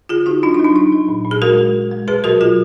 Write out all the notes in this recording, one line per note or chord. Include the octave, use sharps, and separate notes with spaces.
D3 F4 G#4
D3 D#4 F#4
F#3 D4 F4
D#4
F#3 D4
F#3 D#4
F#3
A#2
A#2
G#4
G#3 F#4 A#4
G#3
G#3
G#3
B2 G#4 B4
F#3 F#4 A#4
F#3 F4 G#4